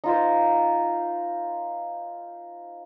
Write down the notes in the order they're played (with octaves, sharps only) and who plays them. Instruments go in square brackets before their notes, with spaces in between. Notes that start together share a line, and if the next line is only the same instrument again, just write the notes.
[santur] D#4 F4 C5